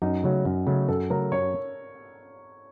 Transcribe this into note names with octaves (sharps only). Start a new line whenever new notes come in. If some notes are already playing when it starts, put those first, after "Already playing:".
F#2 D#4
C#3 F#3 A3
F#2
C#3 F#3 A3
F#2 A4
C#3 F#3 A3 A#4
F#2 C#5